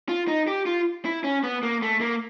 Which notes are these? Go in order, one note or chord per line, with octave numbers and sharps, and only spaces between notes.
F4
D#4
G4
F4
E4
C#4
B3
A#3
A3
A#3